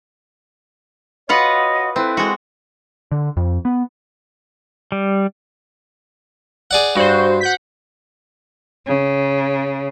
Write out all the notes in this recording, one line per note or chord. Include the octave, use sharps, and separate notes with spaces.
F4 F#4 B4 C#5 D#5 F#5
C4 E4 A4 B4
G#3 F#4
D3
F2
B3
G3
G#4 D5 F#5
G2 F#4 C5
F#5 G6 B6
C#3